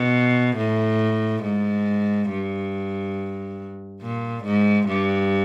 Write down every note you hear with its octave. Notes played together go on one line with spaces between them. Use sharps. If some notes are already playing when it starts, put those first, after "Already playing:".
Already playing: B2
A2
G#2
G2
A#2
G#2
G2